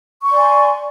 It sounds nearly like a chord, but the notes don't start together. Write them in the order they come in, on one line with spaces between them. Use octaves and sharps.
C#6 C6 D5 G#5